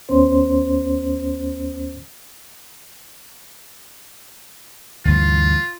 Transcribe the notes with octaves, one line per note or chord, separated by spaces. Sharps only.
D#2 B3 C#4 C5
D2 G2 E3 F4